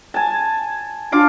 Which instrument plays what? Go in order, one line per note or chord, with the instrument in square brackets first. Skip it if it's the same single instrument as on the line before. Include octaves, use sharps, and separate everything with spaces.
[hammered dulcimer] G#5 A5
[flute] D4 [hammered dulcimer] F4 F5 D6